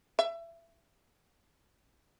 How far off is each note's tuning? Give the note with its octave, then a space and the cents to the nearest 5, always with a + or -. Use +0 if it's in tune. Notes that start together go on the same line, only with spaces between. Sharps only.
E5 +25